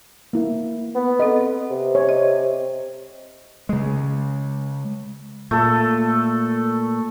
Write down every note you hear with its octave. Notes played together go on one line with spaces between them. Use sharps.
A#3 E4
B3
C4 A4 B4 D#5
C3
C#5
D#5
C#3 G#3
A#2 A3 A4